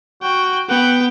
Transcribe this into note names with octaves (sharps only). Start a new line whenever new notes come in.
F#4 G5
B3 F#5 G5